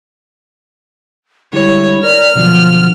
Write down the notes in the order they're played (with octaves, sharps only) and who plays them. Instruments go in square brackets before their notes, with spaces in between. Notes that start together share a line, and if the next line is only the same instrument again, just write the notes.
[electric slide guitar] D3 G3 G#3 [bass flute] E4 [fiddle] C#5
[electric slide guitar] A#4 [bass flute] D5 [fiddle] F6
[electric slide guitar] B2 D3 F#3 [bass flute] F3